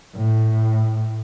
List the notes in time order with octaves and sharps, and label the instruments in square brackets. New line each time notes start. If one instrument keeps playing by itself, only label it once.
[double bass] A2